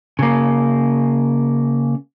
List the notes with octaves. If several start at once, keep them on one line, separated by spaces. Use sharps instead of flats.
C#3 A#3